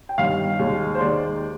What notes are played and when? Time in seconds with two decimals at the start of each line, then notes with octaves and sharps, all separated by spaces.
0.09 G5
0.18 G1 G2 D#3 F5
0.59 D#2 D#3 G#3
0.95 C5
1.01 D#2 D#3 G#3 D5